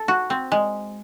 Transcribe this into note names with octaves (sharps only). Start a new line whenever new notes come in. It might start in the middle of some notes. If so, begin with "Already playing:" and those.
Already playing: A4
F#4
C4
G#3